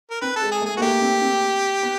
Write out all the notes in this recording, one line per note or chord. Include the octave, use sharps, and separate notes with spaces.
A#4
C4 B4
A4
G#3
G#4
A3
G#4
A#3 F#4
A3 G4
C4
C4
B3